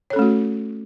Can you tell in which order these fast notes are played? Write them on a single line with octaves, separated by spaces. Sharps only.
C#5 A4 C#4 A3 F#4